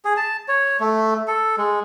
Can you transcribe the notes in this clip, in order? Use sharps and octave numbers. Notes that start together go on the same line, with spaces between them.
G#4
A5
C#5
A3
A4
G#3